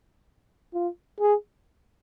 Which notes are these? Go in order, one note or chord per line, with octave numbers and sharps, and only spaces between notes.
F4
G#4